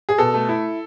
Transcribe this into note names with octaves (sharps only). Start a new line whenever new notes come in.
G#4
B2 A4
A3
E4